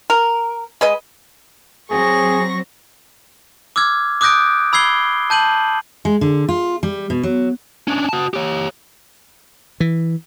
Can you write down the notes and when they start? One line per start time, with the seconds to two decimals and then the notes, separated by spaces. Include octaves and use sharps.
0.10 A#4
0.81 G#3 B4 D#5
1.91 F#3 C4 G#4 C#6 A#6
3.76 D6 E6 F6 G#6
4.21 D6 D#6 F#6 G6 A#6 D7
4.73 B5 E6 G#6 C7 G7
5.30 A5 G6 D#7 F#7
6.05 G#3
6.21 D3
6.49 F4
6.83 G3
7.10 B2
7.23 F#3
7.88 C#4 D4
8.09 F#4 A5
8.34 G4 C#5
9.80 E3